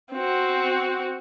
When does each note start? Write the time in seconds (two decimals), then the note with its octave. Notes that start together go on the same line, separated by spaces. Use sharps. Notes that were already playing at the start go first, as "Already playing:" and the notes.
0.12 C4 F#4